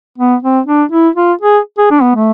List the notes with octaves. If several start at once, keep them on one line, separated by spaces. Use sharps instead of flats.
B3
C4
D4
E4
F4
G#4
G#4
D4
B3
A3